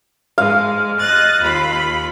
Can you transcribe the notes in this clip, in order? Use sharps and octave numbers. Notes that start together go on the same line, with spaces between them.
G#2 G#3 F5
D#5 F#6 A6
D#2 F4 B5